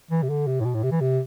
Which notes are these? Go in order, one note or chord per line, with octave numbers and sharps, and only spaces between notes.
E3
C3
D3
C3
A2
B2
A2
C3
E3
C3